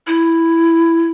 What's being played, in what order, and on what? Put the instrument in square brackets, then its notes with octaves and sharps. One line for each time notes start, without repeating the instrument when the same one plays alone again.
[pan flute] E4